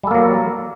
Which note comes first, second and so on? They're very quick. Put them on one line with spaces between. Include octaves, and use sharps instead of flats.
G3 A4 A#3 F#3